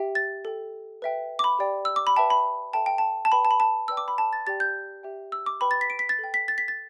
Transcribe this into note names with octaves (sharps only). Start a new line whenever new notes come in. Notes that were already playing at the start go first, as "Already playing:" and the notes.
Already playing: G4 E5 G5
A6
A4 G5
B4 E5 G5
D6
B5
G4 D5 G5
E6
D6
B5
B4 E5 G5 A5
B5
A4 E5 G5 A5
G5
A5
A5
B4 G5 B5
A5
B5
A5
B4 D5 G5 E6
D6
B5
A5
A6
G4 D5 G5 A6
G6
G4 E5 G5
E6
D6
B4 G5 B5
A6
B6
D7
B6
A6
A4 G5
B6
A6
B6
A6